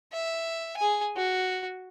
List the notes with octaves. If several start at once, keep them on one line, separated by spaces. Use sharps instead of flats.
E5
G#4 G#5
F#4